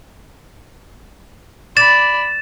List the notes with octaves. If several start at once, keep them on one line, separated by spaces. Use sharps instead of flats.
D5 B5 A6 E7